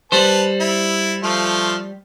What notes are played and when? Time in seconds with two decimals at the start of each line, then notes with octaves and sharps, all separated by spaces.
0.12 G3 B4 C5 A5
0.60 E4
1.23 F3 A3 F4